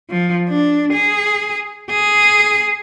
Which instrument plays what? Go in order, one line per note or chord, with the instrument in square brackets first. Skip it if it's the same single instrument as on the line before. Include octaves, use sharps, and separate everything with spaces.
[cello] F3
D4
G#4
G#4